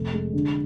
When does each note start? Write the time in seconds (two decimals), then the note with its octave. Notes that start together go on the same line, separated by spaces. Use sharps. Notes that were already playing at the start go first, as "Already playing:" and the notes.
Already playing: F1 A3
0.14 G#3
0.33 D3